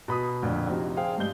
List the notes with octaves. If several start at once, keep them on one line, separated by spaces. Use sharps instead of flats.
B2 B5 D#6
F2 A#2 D3
C3 F3 C4 D#4 F#4
G#4 C5 F5 G5
G2 G3 G#3 G6 G7